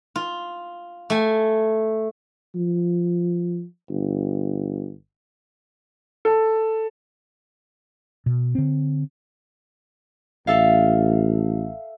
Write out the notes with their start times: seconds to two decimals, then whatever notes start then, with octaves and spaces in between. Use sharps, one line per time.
0.16 F4
1.10 A3 G#5
2.55 F3
3.89 G1
6.25 A4
8.26 B2
8.55 D3 C4
10.47 A1 A4 E5 F5